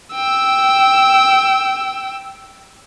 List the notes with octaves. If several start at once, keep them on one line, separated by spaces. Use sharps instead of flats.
G5 E6